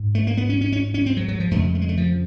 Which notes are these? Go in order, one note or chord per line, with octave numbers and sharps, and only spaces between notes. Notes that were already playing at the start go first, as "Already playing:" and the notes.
Already playing: G#2
A3
A#3
B3
C#4
C#4
C#4
C#4
C4
F#3
F#3
F3
F2 C#3 A3
A3
G#3
A3
F3